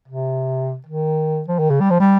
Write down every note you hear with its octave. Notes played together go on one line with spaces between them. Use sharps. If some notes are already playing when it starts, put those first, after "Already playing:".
C3
D#3
F3
D#3
C#3
G3
F3
G3